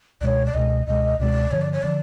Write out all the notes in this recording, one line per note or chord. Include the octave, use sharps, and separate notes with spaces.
C#2 B2 G#3 C#5 D5
D5
C#2 B2 G#3 D#5
C#2 B2 G#3 D#5
C#2 B2 G#3 D5
G2 D3 F3 C#5
D5
C#5
D3 F3 D5